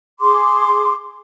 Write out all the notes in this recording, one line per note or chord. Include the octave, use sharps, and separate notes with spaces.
G#4 C6 D6